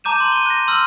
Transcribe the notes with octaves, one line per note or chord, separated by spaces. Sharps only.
A5 A#5 D6 G6 D#7 E7
C6
D#7 G7
F#6 A#6
C6 E6 F6